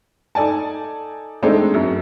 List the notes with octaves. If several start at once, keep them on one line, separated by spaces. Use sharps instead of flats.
D#4 A4 D5 G#5 A5
G#3 A3 C4 D4 D#4 A4
F#2